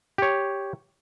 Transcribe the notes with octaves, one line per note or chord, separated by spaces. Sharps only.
G4 C#5